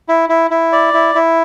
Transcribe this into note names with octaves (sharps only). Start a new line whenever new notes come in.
E4
E4
E4
D5
E4
E4